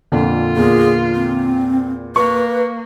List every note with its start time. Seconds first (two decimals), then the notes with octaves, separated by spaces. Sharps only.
0.12 F2 A#2 D3 F4
0.56 E2 A#2 G#4
1.15 C4
2.16 A#3 B4 C#6